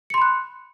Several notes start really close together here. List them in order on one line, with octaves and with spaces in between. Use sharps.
C#7 C6 B5 F#6